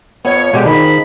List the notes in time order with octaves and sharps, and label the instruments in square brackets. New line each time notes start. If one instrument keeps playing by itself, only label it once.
[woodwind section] F2 C#5 [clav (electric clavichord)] B3
[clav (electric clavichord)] B2 G#3 [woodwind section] D3 G4
[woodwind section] F2 G#3 B5 [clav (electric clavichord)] D#3